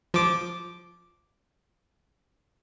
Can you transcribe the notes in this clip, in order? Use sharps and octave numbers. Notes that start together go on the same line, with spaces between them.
F3 D6